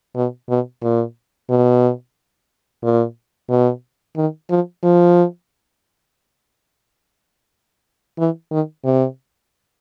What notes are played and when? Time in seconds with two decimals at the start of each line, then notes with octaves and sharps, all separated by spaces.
0.16 B2
0.49 B2
0.82 A#2
1.50 B2
2.83 A#2
3.49 B2
4.16 D#3
4.50 F3
4.83 F3
8.18 E3
8.51 D#3
8.84 C3